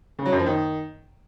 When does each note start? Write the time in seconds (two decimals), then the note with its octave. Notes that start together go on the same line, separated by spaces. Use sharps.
0.19 C#3
0.26 F#3
0.32 F#2
0.39 F3
0.46 D#3